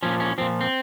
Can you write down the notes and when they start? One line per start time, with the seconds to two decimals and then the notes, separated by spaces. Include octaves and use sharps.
0.03 A#2 F3 C#4
0.20 C#4
0.38 A#2 F3 C4
0.61 C4